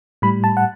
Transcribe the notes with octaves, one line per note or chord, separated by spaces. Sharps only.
A2 G3 B5
A5
F#5